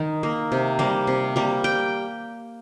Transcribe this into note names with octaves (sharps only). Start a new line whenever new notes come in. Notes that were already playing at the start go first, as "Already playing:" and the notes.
Already playing: D#3
A#3
C3
G3 A#3
C3
G3 A#3
G5